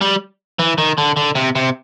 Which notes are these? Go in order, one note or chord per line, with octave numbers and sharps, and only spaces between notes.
G3
E3
D#3
D3
D3
C3
C3